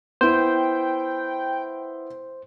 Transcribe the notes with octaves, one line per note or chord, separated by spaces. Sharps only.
B3 E4 C5 G5